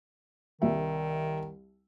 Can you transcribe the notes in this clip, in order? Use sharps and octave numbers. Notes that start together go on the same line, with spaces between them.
C2 D#3 E5